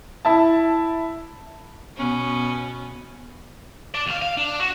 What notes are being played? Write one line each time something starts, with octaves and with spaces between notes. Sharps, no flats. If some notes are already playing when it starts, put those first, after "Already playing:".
E4 A5
B2 B3 C#4
D4 D5
D#2 F5
F5
D4
F#4